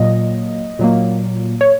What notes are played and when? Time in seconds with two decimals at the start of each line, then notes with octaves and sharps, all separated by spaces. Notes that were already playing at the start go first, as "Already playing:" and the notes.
Already playing: A#2 F#3 A#3 D#5
0.79 A#2 F#3 A#3
1.61 C#5